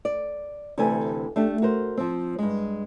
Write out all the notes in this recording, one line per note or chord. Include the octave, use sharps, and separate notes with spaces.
D5
D2 C3 E3 A4 D5 G#5
A3 D4 G4
F#4 A#4 C5
F3 C4
G2 G#3